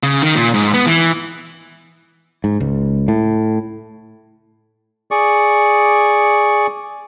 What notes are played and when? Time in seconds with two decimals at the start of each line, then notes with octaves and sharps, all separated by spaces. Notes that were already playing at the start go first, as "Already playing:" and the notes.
0.03 C#3
0.22 D#3
0.36 A#2
0.54 G#2
0.74 B3
0.86 E3
2.44 G#2
2.60 C#2
3.08 A2
5.11 G#4 D5 C#6